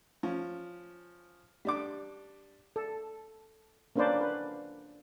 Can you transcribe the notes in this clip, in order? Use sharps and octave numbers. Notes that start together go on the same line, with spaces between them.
F3 C#4
G3 D4 D6
A4
A#3 C#4 D4 B4 C5 D5
B4